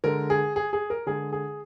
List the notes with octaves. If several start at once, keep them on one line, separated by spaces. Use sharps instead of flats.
D3 G#3 A#4
G#4
G#4
G#4
A#4
D3 G#3 G#4
G#4